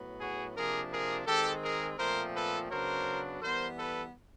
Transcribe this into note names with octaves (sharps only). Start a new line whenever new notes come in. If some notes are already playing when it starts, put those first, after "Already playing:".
Already playing: A2 F#3 B3
F#4 G#4
C3 F3 A#3 D4 G#4 A#4
G#4 A#4
D#3 G#3 C4 G4 A4
G#4 A#4
A#2 F3 A3 C4 A#4 C5
A4 B4
C#3 F#3 B3 D4 A#4 C5
E3 G3 B3 A#4 C5
A4 B4